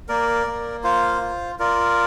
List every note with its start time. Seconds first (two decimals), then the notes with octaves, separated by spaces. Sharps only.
0.09 A#3 A#4 D5
0.47 A#3
0.84 F4 C5 F5
1.21 F4
1.59 F4 A#4 D5